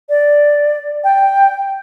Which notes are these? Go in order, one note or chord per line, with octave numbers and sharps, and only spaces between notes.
D5
G5